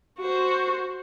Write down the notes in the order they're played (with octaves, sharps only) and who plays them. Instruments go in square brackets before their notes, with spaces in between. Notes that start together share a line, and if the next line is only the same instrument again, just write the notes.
[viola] F#4 C5